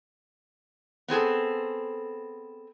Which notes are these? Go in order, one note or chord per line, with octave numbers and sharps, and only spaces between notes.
B3 C4 G#4 A4